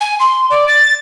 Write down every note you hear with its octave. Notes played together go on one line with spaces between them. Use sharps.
G#5
C6
D5
A6